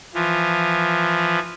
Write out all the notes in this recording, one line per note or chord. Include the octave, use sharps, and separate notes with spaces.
E3 F3